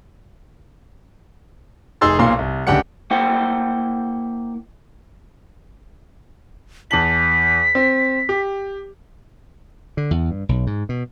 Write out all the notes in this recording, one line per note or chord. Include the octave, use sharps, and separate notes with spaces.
F1 D#4 G#4 C6 E6 A6
B1 A#2 F5 C6
C2
D1 C#2 D4 G4 F#5 C#7
A#3 E4 C5 F#5 G5
E2 A5 B6 F#7
C4
G4
D3
E2
G2
B1
G#2
B2